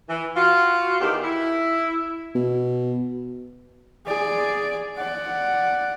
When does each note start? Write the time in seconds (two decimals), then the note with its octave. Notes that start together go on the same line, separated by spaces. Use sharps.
0.09 E3
0.36 F4 F#4
1.01 E2 D#3 G4
1.24 E4
2.35 B2
4.06 G#4 D5
4.97 D5 F#5